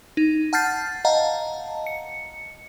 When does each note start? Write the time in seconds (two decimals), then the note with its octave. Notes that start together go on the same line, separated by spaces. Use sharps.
0.17 D#4
0.53 F#5 A5 F6 G6 A6 C7
1.05 D#5 F5 F#5 A5 A#5
1.87 C#7